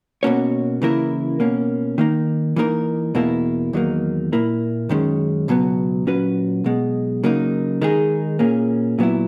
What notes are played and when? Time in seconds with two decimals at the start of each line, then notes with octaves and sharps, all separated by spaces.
0.23 B2 A#3 C#4 F#4 C#5
0.82 C#3 E3 A#3 E4 A#4
1.40 B2 A#3 C#4
1.98 D#3 A#3 D#4
2.56 E3 A#3 D#4 A#4
3.15 E2 B2 A#3 E4
3.73 E2 D#3 F#3 A#3 D#4
4.32 A#2 A#3 E4 A#4
4.89 F#2 D#3 G#3 C#4
5.48 C#2 B2 F#3 B3
6.07 A#2 F#3 C#4 F#4 B4
6.64 B1 B2 G#3
7.24 C#3 F#3 A#3 D#4
7.82 D#3 G#3 D#4 G#4
8.39 A#2 A#3 C#4 G#4
8.99 A#2 F#3 B3 E4